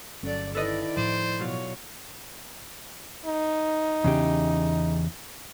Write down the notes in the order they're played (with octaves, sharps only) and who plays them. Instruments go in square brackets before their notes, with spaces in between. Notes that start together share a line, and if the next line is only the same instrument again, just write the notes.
[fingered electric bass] G1 C#4 [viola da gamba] F#3 A4 D5
[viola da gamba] D#3 E4 D5 [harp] A4 B4 D#5
[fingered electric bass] A2 F3 [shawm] C5 [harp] D6
[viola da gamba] B2 C#5 [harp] F#3 F4
[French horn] D#4
[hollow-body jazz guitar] E2 C#3 G4